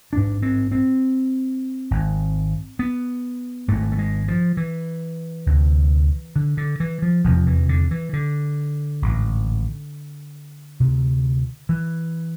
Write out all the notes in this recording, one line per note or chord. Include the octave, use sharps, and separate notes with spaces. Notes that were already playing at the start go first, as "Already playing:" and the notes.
A1 G#2 D4
C4
C4
G#1 G#2
B3
G#1 G#2 A3
A3
G#3
F3
E3
D2 C3
D3
D3
E3
F3
F1 E2 C3 F3
E3
D3
E3
D3
A1 G#2
D2 C3
E3